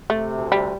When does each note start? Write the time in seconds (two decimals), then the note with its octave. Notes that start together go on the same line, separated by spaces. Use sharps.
0.10 C3 A3
0.30 D2
0.51 C3 G3